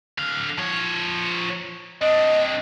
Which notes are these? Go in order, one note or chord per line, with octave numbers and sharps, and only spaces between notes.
D3 F5
F3 C#5
C4 D4 D#5